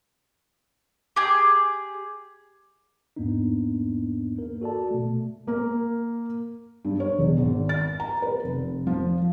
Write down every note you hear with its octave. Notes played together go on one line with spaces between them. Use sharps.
G4 G#4
E2 G#2 A#3 B3 D4 D#4
A#3 A#4
F#4 A4 D5 A5
B2 A3
A#3 A#4
G2
C#5
E1
G#1
A6
A#5
B4
F1
F3